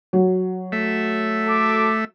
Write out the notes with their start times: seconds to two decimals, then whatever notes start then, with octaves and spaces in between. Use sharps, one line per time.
0.13 F#3
0.72 A3 E5
1.46 A4 D6